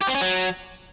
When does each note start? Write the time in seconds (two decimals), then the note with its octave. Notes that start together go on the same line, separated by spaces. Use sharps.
0.01 G4
0.08 C4
0.14 C#4
0.21 F#3